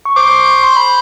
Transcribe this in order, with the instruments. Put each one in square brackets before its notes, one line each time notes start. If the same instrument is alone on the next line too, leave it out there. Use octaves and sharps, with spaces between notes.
[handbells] C#6
[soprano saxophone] C5 [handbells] D6
[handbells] C#6
C6
B5